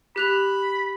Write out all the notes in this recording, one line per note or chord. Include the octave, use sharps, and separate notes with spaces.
G4 B5 F#6 F7